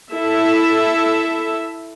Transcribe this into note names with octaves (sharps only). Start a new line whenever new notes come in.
E4 A4 E5